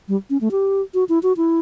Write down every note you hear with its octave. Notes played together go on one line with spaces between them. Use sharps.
G3
C#4
A3
G4
F#4
E4
F#4
E4